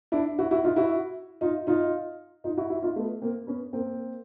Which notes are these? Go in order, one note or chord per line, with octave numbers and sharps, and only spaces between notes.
D4 E4
E4 F#4
E4 F#4
D#4 F4
E4 F#4
D#4 F4
D#4 F4
D#4 F4
E4 F#4
E4 F#4
D#4 F4
A3 B3
A#3 C4
B3 C#4
A#3 C4